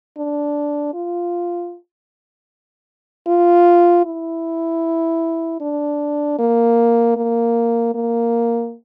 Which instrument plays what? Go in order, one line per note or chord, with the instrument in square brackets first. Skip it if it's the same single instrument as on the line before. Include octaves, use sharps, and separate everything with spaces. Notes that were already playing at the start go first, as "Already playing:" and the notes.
[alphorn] D4
F4
F4
E4
D4
A#3
A#3
A#3